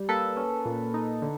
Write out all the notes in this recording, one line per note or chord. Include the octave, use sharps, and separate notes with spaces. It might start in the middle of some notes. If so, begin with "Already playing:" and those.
Already playing: G3
A#3 A4 B4
C#4
A#2
D#4
D3